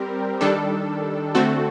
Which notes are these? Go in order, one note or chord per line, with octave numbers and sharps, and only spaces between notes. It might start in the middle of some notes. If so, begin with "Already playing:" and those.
Already playing: G3 C4 G4 A#4
D#3 G3 D4 A4
D3 A3 C4 F#4 A4